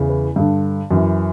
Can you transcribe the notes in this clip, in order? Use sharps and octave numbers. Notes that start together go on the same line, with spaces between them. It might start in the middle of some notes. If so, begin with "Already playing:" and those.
Already playing: E2 C#3 E3
B4
G2 D3
F#2 E3